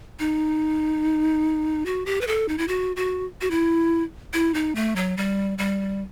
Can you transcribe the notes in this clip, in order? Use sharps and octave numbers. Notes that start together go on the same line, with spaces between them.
D#4
F#4
G4
B4
A4
D#4
E4
F#4
F#4
F#4
E4
E4
D#4
A3
F#3
G3
G3